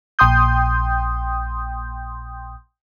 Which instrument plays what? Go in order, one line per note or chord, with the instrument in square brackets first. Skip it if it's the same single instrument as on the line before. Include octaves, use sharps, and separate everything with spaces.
[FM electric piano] A#1 G5 C6 D#6 G6